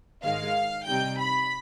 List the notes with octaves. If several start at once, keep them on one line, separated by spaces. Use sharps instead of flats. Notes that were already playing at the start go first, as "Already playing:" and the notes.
G#2 D#3 G#3 F5
C3 G3 C4 D#4 G5
B5